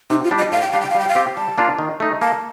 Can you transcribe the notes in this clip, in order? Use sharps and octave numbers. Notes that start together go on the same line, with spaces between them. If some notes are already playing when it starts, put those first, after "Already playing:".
C3 D#4
F4
G3 D4 G4 D5
D#5
A2 F5
G5
G3 D4 G4 F5
G5
F5
G3 G5
F5
C4 G4
G3 A5
A#3 D4 F4
D#3
A3 D#4
A#3 A5